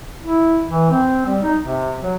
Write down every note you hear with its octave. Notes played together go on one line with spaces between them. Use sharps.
E4
E3
C4
G3
D#4
C3
F#3